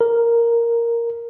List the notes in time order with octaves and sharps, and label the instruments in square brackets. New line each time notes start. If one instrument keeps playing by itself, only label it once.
[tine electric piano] A#4